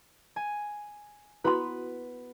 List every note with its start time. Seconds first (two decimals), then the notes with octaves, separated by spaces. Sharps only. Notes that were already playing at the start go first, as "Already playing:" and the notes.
0.36 G#5
1.44 B3 E4 F#4 B4 C6